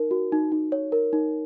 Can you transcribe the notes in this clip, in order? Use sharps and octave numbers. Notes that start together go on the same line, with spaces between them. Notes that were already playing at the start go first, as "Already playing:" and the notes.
Already playing: D#4 A#4
F#4
D#4
D#4
C#5
A#4
D#4